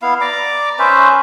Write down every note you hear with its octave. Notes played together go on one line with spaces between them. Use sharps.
B3 E4 F5
D5 A#5 D6
C#4 B4 C5 E5